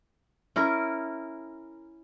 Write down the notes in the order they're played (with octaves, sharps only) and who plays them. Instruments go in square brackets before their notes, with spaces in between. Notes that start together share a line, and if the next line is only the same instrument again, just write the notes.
[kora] C#4 E4 A#4